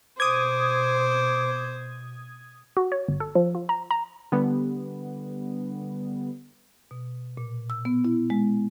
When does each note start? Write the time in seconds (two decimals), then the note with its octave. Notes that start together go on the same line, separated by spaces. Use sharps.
0.20 B2 C5 D6 D#6 G#6
2.77 F#4
2.92 C#5
3.09 G1
3.20 A4
3.35 F3
3.55 F4
3.69 A#5
3.91 A#5
4.32 D3 G3 B3
6.91 B2
7.37 A#2
7.70 E6
7.85 B3
8.04 E4
8.30 G#3